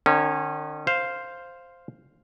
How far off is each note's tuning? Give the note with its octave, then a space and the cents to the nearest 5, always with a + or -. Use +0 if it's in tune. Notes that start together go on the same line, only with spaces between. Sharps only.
D#3 -45 C#4 -20
C5 +0 F5 +0